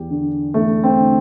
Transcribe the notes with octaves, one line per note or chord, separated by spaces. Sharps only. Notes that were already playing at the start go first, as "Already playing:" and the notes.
Already playing: E2 G4
D3
E2 A3
C4
D3